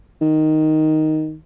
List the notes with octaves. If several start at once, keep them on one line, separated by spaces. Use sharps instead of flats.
D#3